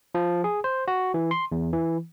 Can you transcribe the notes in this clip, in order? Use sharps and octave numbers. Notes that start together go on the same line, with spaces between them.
F3
G#4
C5
F#4
E3
C6
E2
E3